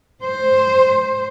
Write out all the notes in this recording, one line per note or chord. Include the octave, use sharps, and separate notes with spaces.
C5